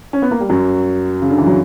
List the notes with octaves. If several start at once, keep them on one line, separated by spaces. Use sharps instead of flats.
C#4
B3
A#3
G3
F#2 F#3
C#3
D3
E3
F#3